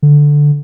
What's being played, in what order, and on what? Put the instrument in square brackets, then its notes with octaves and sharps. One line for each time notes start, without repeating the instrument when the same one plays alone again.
[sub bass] D3